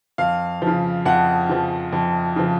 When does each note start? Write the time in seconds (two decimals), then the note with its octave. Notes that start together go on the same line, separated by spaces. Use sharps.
0.18 F2 F5
0.62 C#3 F3
1.05 F2 F#5
1.49 C#3 F3
1.93 F2
2.36 C#3 F3